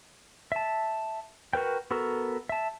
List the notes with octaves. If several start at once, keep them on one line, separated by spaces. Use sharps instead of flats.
E5 A5
F#4 A#4 B4 G5
B3 F#4 A4 A#4
E5 A5